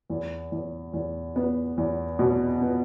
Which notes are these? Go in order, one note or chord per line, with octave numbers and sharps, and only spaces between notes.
E2
E2
E2
B3
E2
B2
B3